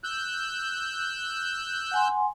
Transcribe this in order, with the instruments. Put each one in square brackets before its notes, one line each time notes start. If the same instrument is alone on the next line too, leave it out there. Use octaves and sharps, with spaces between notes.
[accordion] E6 F#6 G6
[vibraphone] F#5 G#5 C6